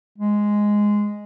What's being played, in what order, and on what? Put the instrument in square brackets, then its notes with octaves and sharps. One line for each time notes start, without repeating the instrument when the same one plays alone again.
[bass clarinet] G#3